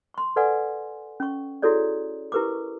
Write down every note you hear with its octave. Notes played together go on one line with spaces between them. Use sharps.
C6 C#6
A4 B4 D5 F#5 G#5
C#4 C#6
E4 F#4 G#4 A4 C#5 D5
E4 G4 A#4 B4 C#6 D6